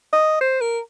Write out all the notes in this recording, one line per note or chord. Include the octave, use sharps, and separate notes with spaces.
D#5
C5
A#4